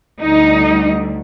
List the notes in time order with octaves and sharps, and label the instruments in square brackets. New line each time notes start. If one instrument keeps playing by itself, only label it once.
[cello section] D2 D3 G3 D#4 D#5